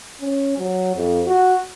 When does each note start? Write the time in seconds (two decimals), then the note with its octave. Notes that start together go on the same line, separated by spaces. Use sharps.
0.21 C#4
0.58 F#3
0.96 F2
1.26 F#4